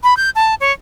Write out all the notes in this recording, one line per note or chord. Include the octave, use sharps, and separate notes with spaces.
B5
G6
A5
C#5